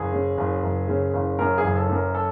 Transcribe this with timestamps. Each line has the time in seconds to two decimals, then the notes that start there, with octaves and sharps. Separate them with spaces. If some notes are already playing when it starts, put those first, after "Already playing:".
Already playing: F#1 G#4
0.13 C#3
0.38 F#1
0.63 F#1
0.88 C#3
1.13 F#1
1.39 F#2 A#4
1.58 G#4
1.64 F#1
1.77 A4
1.89 F#2
1.95 A#4
2.15 A4